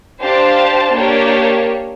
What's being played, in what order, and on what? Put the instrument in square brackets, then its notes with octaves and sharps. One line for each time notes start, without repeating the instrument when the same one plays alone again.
[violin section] D4 G4 C5 F5 A5
A#3 D4 G4 A#4 C#5